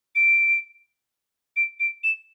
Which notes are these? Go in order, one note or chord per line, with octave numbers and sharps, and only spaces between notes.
D7
D7
D7
E7